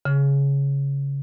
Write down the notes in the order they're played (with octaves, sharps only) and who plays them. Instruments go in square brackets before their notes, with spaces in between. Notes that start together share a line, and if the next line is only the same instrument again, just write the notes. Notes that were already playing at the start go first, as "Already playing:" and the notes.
[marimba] C#3